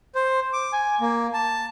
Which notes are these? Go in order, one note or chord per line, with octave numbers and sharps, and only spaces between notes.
C5
D6
G#5
A#3
A5